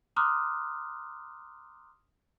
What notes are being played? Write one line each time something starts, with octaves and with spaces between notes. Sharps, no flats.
A#5 C6 D6 D#6 F6 F#6